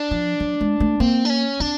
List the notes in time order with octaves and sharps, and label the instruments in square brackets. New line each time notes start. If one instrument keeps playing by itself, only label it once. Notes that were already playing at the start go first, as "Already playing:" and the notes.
Already playing: [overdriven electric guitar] D4
[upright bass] F3
F#3
G#3
A3
[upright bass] A#3 [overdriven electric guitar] C4
[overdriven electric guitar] D4
C#4
[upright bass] C4 [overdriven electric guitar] D4